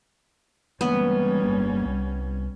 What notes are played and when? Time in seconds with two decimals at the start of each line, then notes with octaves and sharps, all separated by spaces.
0.81 E3 G3 G#3 A#3 B3 C#4
1.42 G1 A#3 D4
1.86 C2